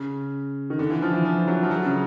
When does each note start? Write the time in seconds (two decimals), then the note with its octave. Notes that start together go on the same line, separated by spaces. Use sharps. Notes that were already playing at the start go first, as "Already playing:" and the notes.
Already playing: C#3
0.70 D#3
0.79 D3
0.90 E3
1.02 F3
1.13 E3
1.25 F3
1.48 F#3
1.63 F3
1.71 F#3
1.85 C#3